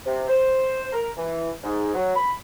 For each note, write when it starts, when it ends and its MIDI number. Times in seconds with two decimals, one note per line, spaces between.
0.06 0.25 48
0.28 0.91 72
0.93 1.09 70
1.17 1.50 52
1.64 1.91 44
1.95 2.14 54
2.15 2.33 83